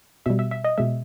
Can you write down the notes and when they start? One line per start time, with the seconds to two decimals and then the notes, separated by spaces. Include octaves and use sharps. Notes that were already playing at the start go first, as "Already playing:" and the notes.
0.26 B2 G3 E5
0.39 E5
0.51 E5
0.64 D#5
0.78 B2 G#3 E5